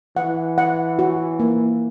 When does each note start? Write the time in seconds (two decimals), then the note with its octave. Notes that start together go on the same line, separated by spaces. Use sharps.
0.17 E3 F#5
0.58 F#5
0.99 F#4
1.39 A#3